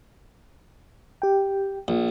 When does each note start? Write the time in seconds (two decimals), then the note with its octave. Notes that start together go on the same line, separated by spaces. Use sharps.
1.22 G4 G5
1.88 A#1